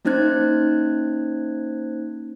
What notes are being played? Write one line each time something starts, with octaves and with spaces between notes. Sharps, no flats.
A#3 C#4 D#4 C5 F#6 G#6